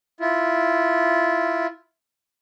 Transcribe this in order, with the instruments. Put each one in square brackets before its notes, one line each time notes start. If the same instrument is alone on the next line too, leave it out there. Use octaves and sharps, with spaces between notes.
[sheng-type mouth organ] E4 F4